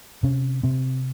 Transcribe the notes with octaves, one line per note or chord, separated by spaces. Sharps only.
C3 C#4
C3 C4